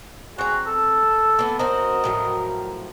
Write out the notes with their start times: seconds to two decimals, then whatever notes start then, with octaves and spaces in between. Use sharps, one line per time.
0.38 C4 F#4 G#4 A#5
0.67 A4 E6
1.39 A#3 B3
1.59 C4 F#4 A#4 C5 D#5
2.04 A2 F3 F#3